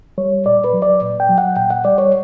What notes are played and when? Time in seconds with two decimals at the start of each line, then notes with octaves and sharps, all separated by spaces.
0.18 G3 C#5
0.45 A#2 D5
0.64 B4
0.73 F#3
0.82 D5
1.01 A#2
1.20 G5
1.29 F#3
1.38 F#5
1.56 A#2 G5
1.71 F#5
1.85 G3 D5
1.98 C#5